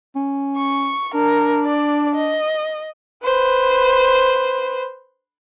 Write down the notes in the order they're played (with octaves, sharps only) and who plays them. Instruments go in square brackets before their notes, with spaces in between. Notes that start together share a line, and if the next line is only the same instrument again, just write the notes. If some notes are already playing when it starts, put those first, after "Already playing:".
[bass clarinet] C#4
[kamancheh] C#6
[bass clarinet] D4 [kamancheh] A#4
[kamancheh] D5
D#5
B4 C5